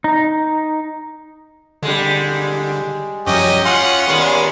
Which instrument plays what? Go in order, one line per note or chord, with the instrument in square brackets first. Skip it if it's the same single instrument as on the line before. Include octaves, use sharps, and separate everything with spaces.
[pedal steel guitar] D#4
[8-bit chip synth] D3 [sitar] G3 G#3
[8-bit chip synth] F#2 F#3 [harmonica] C#4 G4 [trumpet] D#5
[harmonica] C#4 F4 [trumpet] F#5 [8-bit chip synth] C6
[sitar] D#2 A#2 G#3 [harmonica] B3 C#4